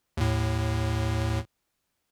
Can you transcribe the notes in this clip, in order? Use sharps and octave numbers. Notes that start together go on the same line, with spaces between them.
D#2 A2